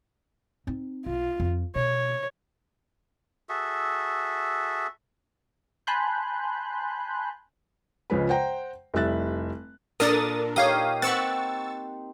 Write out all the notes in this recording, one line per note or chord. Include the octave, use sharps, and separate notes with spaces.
C4 D#4
B1 F4
F2
B2 C#5
F#4 G#4 A4 E5
G#5 A5 B5 C6 F#6 G6
C#2 C#3 F3 G#3 B4
C5 F#5 G5 A#5
F1 G3 E4 E5 F#6 A6
A#2 D4 A4 A#4 D#6 A6
D#4 G4 C#5 F5 D#6
C4 F#5 B5 C#6 E6 A6